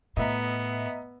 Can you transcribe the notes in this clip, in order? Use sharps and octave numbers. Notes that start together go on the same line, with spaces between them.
A2 B3 D#5 E5 A#5